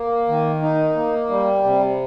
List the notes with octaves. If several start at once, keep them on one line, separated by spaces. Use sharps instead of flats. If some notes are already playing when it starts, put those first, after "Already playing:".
Already playing: A#3
D#3
D#4
A#3
G3
C3